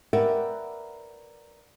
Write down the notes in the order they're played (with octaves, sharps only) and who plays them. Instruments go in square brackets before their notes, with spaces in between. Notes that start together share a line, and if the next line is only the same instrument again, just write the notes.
[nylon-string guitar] A#4 B4 D5 E5 F#5 G5